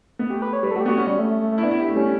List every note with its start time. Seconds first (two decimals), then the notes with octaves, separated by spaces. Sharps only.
0.19 B3
0.30 A3 G4
0.42 B4
0.53 C#5
0.63 G3 B4
0.71 A4
0.75 A3 F#4
0.81 G4
0.86 B3 F#4
0.97 C#4 F#4
1.07 G3
1.19 A3
1.30 A3
1.41 A3
1.52 A3
1.58 E4
1.63 B3 D4
1.71 E4
1.79 G4
1.88 A3
1.96 G3 C#4